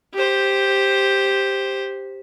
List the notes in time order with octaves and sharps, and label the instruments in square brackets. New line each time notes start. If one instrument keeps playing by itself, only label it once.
[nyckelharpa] G4 C5